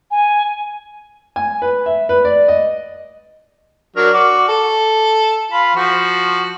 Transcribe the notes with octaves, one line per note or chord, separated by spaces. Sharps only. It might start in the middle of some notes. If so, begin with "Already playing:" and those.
G#5
G#5
B4
E5
B4
D5
D#5
F#3 D4 A#4
F#4 D5
A4
F4 B5
F3 F#4